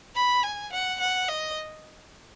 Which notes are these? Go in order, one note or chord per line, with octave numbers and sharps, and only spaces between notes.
B5
G#5
F#5
F#5
D#5